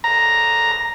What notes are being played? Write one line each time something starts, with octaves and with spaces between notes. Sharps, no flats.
A#5